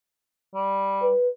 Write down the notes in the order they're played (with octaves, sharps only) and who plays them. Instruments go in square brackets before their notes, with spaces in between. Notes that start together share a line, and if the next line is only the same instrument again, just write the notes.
[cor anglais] G3
[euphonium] B4